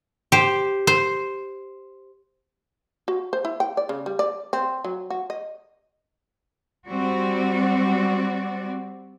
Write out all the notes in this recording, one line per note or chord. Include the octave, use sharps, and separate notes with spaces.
G4 C5
C5
F#4
C5
E4
G5
D5
C#3
G3
D5
C4
F#3
F#4
D#5
G3 C4 F#4 D5